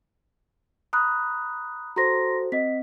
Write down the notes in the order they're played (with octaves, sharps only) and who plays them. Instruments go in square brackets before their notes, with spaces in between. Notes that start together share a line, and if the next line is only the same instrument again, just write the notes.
[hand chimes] A#5 B5 [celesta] D#6 F#6
[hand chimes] F#4 A4 C5 [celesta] A#5 C6 A#6
[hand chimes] C4 [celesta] D#5 B6